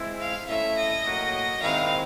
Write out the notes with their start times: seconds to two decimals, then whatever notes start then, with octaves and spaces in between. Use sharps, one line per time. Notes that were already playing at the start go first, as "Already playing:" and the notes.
Already playing: G#3 C4 E4
0.20 F5
0.48 A3 C#4 E4 E5
0.76 D#5
1.05 A2 F#3 A#3
1.62 D#3 G#3 C4 E4 F5